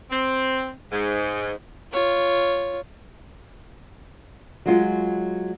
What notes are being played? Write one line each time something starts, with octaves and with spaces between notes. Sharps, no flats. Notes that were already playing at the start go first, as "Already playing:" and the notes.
C4
G#2
F4 C#5
F#3 G#3 F4